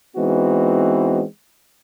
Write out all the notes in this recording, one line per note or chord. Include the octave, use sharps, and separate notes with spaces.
E3 G#3 B3 C4 D#4 F#4